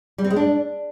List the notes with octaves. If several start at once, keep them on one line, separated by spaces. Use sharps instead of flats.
G3
C4
G#3
D4